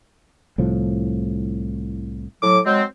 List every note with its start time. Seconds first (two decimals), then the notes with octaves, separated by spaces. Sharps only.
0.58 C2 A2 F3
2.43 A2 F#3 D6
2.65 F#3 G#3 C4